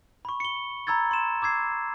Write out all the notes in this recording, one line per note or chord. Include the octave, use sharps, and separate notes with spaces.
B5 C#6
C#7 G7
A#5 B5 E6 G#6 A6
C6 E7
D6 E6 G#6 C7